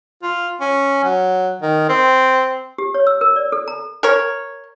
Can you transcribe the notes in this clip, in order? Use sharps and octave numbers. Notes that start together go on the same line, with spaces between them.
F4
C#4
F#3
D#3
C4
G4
C#5
E6
A#4
D5
A4
A#5
A#4 C#5